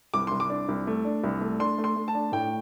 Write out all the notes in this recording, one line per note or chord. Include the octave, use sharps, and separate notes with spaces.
C2 D6
C2 C6
D6
D4
C2
A3
D4
C2
A3
D4 C6
A3
C6
A3
A5
D4
A2 G5